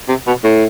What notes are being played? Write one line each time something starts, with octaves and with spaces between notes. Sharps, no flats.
C3
B2
A2